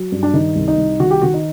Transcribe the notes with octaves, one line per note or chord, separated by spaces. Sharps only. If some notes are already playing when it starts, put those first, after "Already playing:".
Already playing: F#3
G2
D4
D#3 D#4
C2
D#4
C2
D#3 F#4
G4
D#3 F#4
D#4